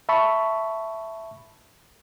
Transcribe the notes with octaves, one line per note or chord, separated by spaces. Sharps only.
E5 A5 B5 C#6